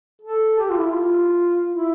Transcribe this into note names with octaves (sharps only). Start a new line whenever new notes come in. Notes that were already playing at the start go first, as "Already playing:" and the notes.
A4
G4
F4
E4
F4
E4